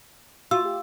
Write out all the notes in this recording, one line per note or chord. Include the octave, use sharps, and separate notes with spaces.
F4 F#4 E6
G4